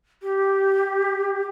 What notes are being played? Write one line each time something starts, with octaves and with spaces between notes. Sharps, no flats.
G4